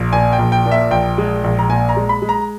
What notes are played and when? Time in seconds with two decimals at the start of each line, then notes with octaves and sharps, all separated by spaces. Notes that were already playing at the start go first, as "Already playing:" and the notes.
Already playing: A#1
0.13 A#2 G#5
0.32 G5
0.39 A#1
0.52 G5
0.66 A#2
0.71 E5
0.91 A#1 G5
1.18 G#3
1.44 A#1
1.59 A#5
1.69 A#2 G#5
1.89 A#5
1.97 G#3
2.09 B5
2.22 G#3
2.29 A#5